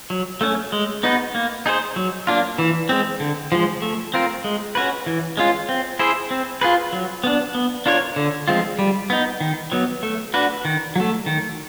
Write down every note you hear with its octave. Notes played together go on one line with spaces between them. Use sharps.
F#3
A3 C#4
G#3
B3 D#4 F#4 B4
A#3
D#4 G#4 C5
F#3
A#3 D4 F4
E3
G#3 C4
D3
F3 G#3
A3
C4 F4 A#4
G#3
C#4 F#4 B4
E3
G#3 C#4 F4
C4
E4 G#4 C5
C4
F4 G#4 B4
F#3
B3 D4
B3
D4 F4 A#4 C#5
D3
F3 G#3 C4 F4
G3
B3 D#4
D#3
F#3 B3
A3
D4 F#4 B4
D#3
F#3 A3
D#3